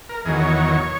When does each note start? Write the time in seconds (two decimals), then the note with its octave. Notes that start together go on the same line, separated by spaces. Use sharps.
0.09 A#4
0.25 E2 D#3 F#3 G#4
0.42 C#5